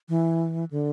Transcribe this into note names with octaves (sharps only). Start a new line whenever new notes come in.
E3
D3